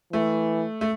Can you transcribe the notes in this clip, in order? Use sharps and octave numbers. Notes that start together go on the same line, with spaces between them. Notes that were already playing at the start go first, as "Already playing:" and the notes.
E3 A3
A3